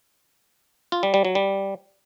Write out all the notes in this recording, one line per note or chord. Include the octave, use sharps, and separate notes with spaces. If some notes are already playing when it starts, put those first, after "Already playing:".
F4
G3
G3
F#3
G3